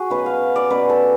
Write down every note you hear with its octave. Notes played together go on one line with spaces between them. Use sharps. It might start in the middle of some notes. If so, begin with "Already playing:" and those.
Already playing: F#4 G#4
B2 F#3 C#4 B4
F5
D5
B2 F#3 C#4 B4
A4